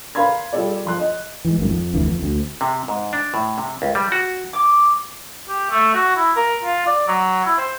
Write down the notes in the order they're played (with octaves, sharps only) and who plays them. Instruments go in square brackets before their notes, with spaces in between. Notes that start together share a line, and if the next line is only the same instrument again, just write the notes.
[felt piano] A#4 F5 B5 C6 G#6
G3 F4 G#4 A4 D5
F3 C6 F#6
D#5
[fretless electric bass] E3 G#3
G#1 F#2 D#3
F2
F1 D2 D3 E3
F2
D2
[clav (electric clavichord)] C3
G#2
D4
A2
C3
C#2
G3
F#4
[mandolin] D6
[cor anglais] G4
A3
F#4
E4
A#4
F4
D5
F#3
E4
C5